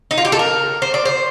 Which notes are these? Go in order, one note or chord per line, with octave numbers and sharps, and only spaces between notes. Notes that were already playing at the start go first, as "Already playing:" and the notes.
D#4
F4
G4
A4
A#4
C5
D5
C5